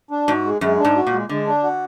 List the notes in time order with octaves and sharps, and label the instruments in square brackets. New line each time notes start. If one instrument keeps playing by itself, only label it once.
[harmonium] D4
[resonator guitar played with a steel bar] G#2 [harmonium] F#4
[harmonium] G#3
[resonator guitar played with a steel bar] F#2 [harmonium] G#3
[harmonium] D4
[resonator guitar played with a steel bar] G#2
[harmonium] F#4
[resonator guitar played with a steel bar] A#2
[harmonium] G#3
[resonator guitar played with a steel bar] D3 [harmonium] G#3
[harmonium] D4
F#4